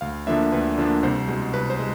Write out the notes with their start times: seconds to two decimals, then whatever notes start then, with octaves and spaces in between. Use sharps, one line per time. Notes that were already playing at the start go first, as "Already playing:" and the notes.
0.01 D2 F5
0.27 D3 F3 A#3 D4 E5
0.52 D2 B4
0.78 D3 F3 A#3 D4
1.03 C2 C5
1.28 B2 G#3
1.54 C2 B4
1.70 C5
1.79 G#3